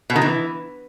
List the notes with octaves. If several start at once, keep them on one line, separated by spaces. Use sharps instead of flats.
B2
D#3
E3